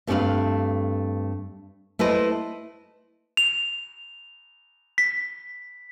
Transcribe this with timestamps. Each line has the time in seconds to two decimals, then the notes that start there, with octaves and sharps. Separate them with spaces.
0.07 G2 A3 C4 A4 B4 F5
1.99 A3 E4 B4 C5 D#5
3.37 F7
4.98 B6